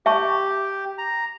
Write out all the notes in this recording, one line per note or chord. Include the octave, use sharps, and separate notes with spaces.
G4 E5 A5 C#6
A#5